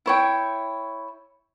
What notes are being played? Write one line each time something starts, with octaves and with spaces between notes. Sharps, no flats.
E4 C#5 G5